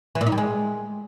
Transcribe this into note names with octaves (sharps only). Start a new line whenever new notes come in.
E3
A#2
D#4
G3
G#3